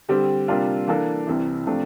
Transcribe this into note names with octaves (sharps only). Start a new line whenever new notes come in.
D3 G3 C4 G4
C3 G3 A#3 D4 F4
E3 A#3 D4 A4
C2 C3 E3
C3 F3 A3 D4